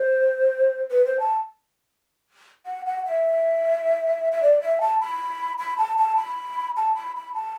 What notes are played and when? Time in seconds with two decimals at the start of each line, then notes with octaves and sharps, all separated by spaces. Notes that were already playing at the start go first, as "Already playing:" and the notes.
Already playing: C5
0.91 B4
1.06 C5
1.20 A5
2.66 F#5
2.86 F#5
3.05 E5
4.32 E5
4.43 D5
4.61 E5
4.81 A5
5.01 B5
5.59 B5
5.78 A5
5.98 A5
6.17 B5
6.77 A5
6.95 B5
7.16 B5
7.35 A5